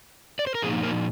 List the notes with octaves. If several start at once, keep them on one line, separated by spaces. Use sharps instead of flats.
D5
C5
A#4
A#2 F3 A#3 D#4 G#4
A#3 A#4